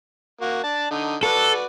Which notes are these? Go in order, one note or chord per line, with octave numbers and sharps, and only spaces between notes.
A#3 F#4
D4 A5
D3 D#4
F#4 A4 B4 D5